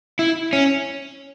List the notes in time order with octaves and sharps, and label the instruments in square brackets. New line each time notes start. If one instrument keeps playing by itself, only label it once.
[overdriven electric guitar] E4
C#4